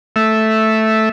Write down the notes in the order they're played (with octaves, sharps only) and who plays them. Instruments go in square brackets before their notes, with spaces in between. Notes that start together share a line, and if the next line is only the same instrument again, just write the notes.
[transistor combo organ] A3 E5